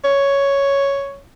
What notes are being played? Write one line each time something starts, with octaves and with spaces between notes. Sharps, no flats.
C#5